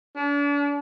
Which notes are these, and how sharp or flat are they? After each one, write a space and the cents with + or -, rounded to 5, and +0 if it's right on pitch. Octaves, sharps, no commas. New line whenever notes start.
D4 -40